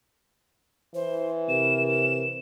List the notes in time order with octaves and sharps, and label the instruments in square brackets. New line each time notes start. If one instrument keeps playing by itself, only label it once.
[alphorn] E3 [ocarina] C5
[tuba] C3 [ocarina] A#4 [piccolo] E7
[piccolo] E7